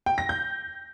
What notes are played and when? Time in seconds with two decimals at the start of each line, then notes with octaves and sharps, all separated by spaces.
0.06 G5
0.18 A#6
0.29 G6